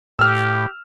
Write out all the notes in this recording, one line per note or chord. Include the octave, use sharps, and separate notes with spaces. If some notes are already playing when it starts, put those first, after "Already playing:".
A2 G4 E6 F6